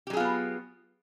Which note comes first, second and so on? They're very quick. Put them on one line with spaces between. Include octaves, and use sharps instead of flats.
G4 F#3 G#4 F4 B3